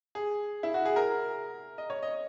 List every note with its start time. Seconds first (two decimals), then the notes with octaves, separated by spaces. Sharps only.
0.15 G#4
0.63 E4
0.74 F#4
0.85 G#4
0.96 A#4
1.78 D#5
1.90 C#5
2.02 D#5